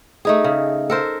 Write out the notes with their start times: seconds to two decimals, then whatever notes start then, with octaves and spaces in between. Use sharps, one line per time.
0.25 A3 D#4 G#4
0.44 C#3
0.90 A4 A#4 C5